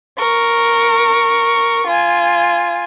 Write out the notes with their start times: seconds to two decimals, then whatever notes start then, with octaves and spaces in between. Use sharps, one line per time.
0.19 A#4 C#6
1.87 F4 G#5